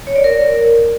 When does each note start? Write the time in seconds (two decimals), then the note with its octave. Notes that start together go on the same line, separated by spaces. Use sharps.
0.07 C#5
0.16 D5
0.24 A#4